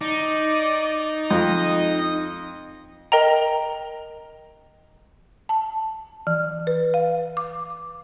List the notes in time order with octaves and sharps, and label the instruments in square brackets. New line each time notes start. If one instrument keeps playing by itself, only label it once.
[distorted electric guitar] D#4 [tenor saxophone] D5
[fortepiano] F2 [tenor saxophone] D#5
[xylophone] A#4 D#5 G5 A#5
[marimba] A5
E3
B4
F5
D6